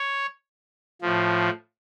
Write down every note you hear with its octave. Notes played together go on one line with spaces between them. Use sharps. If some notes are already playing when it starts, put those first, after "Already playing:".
Already playing: C#5
A2 F3